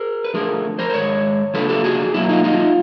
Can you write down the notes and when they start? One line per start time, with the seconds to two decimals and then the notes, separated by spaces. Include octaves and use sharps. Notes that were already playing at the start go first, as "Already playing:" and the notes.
Already playing: G#4 A#4
0.24 B4
0.34 D3 F3 A3 G#4 A#4
0.79 A#4 C5
0.90 C5
0.94 G#2 D#3 G#3 C#5
1.54 C#3 F3 A#3 D4 A4 B4
1.69 G4 A4
1.84 F#4 G#4
2.14 B2 F#3 A#3 E4
2.29 D#4 F4
2.44 D#4 F4